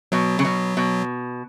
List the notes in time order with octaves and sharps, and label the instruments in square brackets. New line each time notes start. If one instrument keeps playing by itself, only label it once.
[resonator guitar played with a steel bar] B2 [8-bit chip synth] F#3
[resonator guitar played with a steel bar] C#3
B2
B2